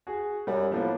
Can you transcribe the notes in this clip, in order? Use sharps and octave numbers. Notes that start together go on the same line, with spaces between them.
F#4 G#4
F#2 G3
A2 F3 A#3 B3